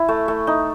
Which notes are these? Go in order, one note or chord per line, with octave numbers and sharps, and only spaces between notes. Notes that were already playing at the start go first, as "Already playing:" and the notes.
Already playing: E4
A3
A3
D#4